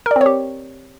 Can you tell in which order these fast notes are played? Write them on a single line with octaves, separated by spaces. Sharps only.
A#4 D5 C4 C#5 G4